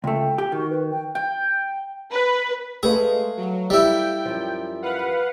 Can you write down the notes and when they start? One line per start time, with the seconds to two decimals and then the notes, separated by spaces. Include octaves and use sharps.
0.04 C#2 A3 G5
0.38 G4
0.52 D#3 F#4
0.70 B4
0.91 G5
1.15 G5
2.12 B4
2.83 G#3 A3 G#4 B4 F5
3.37 F#3
3.70 G3 E4 G5
4.25 F#2 F3
4.82 B4 F5 F#5